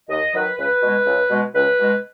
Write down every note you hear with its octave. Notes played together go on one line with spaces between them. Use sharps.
D#2 D#5
D#3 F#3 B4
C#2 B4
B2 G#3
C#2
B2 G#3
C#2 B4
B2 G#3